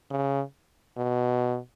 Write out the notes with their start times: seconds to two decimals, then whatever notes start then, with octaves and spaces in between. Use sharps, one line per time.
0.11 C#3
0.97 B2